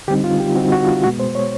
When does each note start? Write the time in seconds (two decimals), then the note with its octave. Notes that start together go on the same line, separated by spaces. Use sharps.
0.08 D3 G3 C4 D#4 G4
0.24 F4
0.40 G4
0.55 D3 G3 C4 D#4 F#4
0.72 F#4
0.87 F4
1.03 B2 G#3 B3 F#4
1.19 C5
1.35 C#5